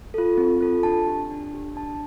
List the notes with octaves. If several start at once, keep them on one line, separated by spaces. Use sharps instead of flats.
F4 A4
C4
F4 A4
D4 A5
G4
D4
G4
D4 A5